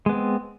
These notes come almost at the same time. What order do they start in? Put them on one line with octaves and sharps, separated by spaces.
G#3 B3 C4